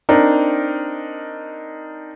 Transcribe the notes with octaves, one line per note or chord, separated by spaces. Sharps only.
C4 D4 D#4 A#4